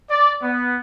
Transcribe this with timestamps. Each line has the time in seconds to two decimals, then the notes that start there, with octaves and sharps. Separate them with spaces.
0.10 D5
0.42 B3